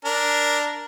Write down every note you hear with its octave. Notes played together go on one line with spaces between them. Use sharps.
D4 A#4